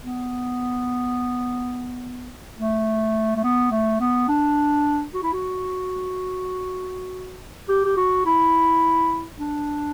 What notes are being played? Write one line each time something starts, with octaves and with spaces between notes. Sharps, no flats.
B3
A3
A3
B3
A3
B3
D4
F#4
E4
F#4
G4
G4
F#4
E4
D4